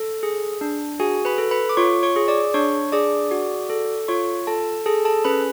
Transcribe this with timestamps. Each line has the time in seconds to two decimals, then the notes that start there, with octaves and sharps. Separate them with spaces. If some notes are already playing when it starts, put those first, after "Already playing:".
Already playing: A4
0.23 G#4
0.61 D4
1.00 F#4 G#4 G#5
1.25 B4 B5
1.38 A4
1.51 B4 B5
1.69 D6
1.77 F4 C#5 C#6
2.03 C#5 C#6
2.16 G#4
2.28 D5 D6
2.54 D4 C#5 C#6
2.92 G#4 D5 D6
3.31 F#4
3.70 A4
4.08 F4 C#5 C#6
4.47 A4 A5
4.86 G#4 A4 A5
5.05 A4 A5
5.24 C#4 B4 B5